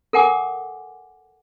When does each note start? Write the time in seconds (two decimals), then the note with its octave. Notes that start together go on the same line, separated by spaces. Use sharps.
0.13 A4 A#4 F#5 G#5 D6